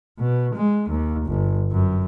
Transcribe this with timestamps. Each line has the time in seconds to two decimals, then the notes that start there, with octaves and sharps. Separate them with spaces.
0.19 B2
0.55 G#3
0.90 D#2
1.26 G1
1.71 F#2